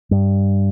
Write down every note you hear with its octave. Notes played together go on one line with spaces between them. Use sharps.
G2